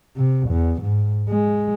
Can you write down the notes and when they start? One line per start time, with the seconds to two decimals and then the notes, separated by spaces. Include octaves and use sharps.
0.17 C3
0.49 E2
0.82 G#2
1.29 G#3